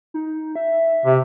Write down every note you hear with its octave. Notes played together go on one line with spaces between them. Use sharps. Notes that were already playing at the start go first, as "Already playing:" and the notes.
D#4
E5
C3